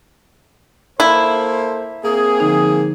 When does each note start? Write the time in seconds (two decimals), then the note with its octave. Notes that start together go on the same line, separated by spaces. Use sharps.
1.00 A#3 E4 A4 C5
2.05 A#3 C4 G#4
2.40 D3 F3 D#4